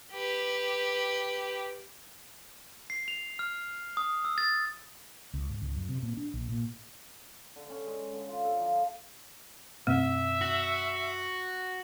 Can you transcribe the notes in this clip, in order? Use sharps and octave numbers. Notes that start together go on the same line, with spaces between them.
G4 B4
C7
F7
F6
D#6
E6
A6
C#2
G#2
C#2
F#2
C3
A#2
D4
A#1
A#2
D3
C#4
G#3
D3
F4
A4
F3
F#2 B2 A3 C4 E5
F#4